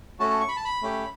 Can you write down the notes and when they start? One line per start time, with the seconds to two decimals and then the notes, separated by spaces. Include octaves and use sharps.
0.20 A3 C#4 F#4 A5
0.30 A5
0.41 C#6
0.48 B5
0.56 A5
0.65 B5
0.82 A3 C#4 G4